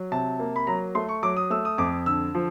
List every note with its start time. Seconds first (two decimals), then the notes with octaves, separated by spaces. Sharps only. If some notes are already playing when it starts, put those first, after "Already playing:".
Already playing: F#3
0.12 C3 A5
0.39 A#3
0.56 B5
0.67 F#3 A#5
0.95 A3 C6
1.09 C#6
1.23 F#3 D6
1.37 D#6
1.50 A3 E6
1.65 D#6
1.78 F2 D6
2.06 D3 E6
2.35 F3